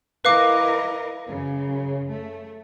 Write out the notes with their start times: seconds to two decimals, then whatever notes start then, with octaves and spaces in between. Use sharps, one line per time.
0.25 E4 A#4 B4 D#5 F5 D6
1.27 F#2 C#3
2.11 A3